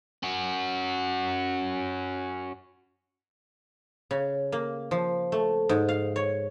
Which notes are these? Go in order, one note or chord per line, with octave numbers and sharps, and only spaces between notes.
C#4 F#4
C#3
A#3
F3
A3
G#2
F5
C#5